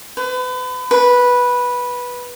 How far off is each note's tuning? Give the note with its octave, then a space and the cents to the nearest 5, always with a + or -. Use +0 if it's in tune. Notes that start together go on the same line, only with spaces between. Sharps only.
B4 +35
B4 -10